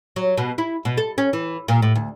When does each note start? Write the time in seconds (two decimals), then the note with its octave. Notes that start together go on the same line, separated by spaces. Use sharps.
0.16 F#3
0.37 B2
0.58 E4
0.85 B2
0.97 A4
1.18 C#4
1.33 E3
1.68 A#2
1.82 A2
1.96 D2